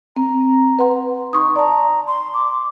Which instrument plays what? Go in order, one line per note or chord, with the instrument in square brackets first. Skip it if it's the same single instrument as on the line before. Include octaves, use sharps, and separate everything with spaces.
[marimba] C4 [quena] A#5
[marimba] B4 F#5 C6
[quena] D#4 [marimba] C6 C#6 D#6
[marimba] D5 A5 [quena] A#5
[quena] C6
D6